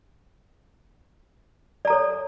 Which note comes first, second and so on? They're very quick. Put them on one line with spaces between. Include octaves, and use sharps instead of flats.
D5 A#5 A4 C#5